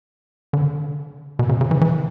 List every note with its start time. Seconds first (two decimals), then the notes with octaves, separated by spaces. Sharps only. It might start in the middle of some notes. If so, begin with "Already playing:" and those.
0.53 D3
1.39 B2
1.49 C#3
1.61 C#3
1.71 E3
1.81 E3